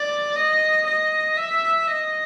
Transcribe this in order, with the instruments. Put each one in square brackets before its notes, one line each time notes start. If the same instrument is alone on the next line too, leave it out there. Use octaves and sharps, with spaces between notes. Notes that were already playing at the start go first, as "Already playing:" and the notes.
Already playing: [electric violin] D5
D#5
D#5
E5
D#5